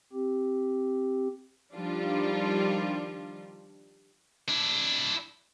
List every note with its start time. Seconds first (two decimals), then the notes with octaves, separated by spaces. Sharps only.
0.13 C4 G4
1.74 D#3 F3 G3 D4 F4
4.49 D4 E4